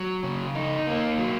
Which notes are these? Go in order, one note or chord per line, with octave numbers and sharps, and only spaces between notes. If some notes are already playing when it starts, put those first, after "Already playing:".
Already playing: F#3
C#3
D#4
A#3
F#3